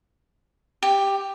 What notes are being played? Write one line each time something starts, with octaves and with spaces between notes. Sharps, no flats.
G4